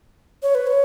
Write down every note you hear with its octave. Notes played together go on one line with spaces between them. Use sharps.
C#5
B4
C#5